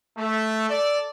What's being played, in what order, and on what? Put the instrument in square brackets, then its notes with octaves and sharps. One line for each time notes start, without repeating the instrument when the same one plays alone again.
[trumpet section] A3
A4 D5